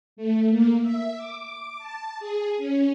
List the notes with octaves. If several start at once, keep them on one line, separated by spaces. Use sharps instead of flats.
A3
A#3
E5
D6
A5
G#4
C#4